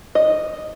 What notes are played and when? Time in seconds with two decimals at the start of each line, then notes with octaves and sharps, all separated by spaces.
0.15 D#5